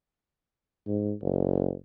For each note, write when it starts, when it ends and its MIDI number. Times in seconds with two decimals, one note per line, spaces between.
0.87 1.13 44
1.21 1.73 30